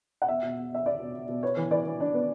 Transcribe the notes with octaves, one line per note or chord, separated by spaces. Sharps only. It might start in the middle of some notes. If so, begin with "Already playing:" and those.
F#5
E2 E5
B2
E2
E2 E5
E2 D5
B2
E2
B2
B3 C#5
E3
E3 D5
E3
D4
B3